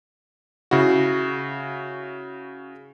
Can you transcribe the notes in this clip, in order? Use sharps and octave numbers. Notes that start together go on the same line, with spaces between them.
C#3 E4 F#4